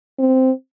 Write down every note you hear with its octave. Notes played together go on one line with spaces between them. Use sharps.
C4